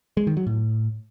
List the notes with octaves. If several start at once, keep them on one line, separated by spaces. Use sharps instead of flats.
G#3
D#3
F#3
A2